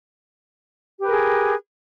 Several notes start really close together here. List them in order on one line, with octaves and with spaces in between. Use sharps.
G4 B4 A#4 G#4